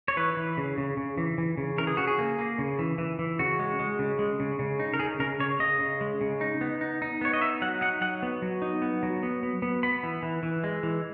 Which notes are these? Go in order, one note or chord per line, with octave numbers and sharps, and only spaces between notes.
C#5
E3 B4
E3
C#3
C#3
C#3
E3
E3
C#3
E3 A#4
G#4
C#3 F#4
G#4
A#3
A#3
C#3
E3
E3
E3
C#3 F#4
G#3
G#3
C#3
G#3
C#3
C#3
D#4
A#4
C#3 G#4
C#3 A#4
C#3 C#5
C#3 D#5
C#3
G#3
C#3
D#4
B3
D#4
D#4
B3 C#5
D#5
D#4 E5
F#3 F#5
D#4 F#5
F#3 F#5
B3
F#3
D#4
B3
F#3
B3
B3
B3
B3 B5
E3
E3
E3
G#3
E3